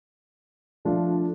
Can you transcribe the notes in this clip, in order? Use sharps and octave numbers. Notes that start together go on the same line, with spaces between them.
F3 A3 D4 F4